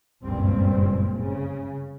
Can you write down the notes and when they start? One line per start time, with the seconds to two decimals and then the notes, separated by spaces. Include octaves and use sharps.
0.24 F#1 C#2 G2 A#2 G3 C4
1.21 C#3